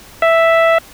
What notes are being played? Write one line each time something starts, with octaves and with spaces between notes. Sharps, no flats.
E5